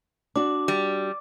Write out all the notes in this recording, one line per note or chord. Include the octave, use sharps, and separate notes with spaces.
D4 F#4 D6
G3